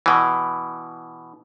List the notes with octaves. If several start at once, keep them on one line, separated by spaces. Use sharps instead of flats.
B2 E3